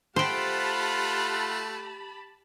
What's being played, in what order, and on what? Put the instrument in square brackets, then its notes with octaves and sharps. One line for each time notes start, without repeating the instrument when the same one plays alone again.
[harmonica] A3 F#5 [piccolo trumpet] F4 [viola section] G4 A5 B5 [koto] C5 G5